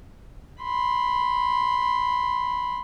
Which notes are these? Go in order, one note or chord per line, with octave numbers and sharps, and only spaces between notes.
B5 C6